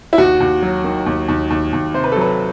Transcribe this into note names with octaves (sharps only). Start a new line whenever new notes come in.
E4
D#2 F#4
D#2
F#3
D#3
D#2
D#2
D#2
D#2
C3 C5
B4
A4
F#3
B4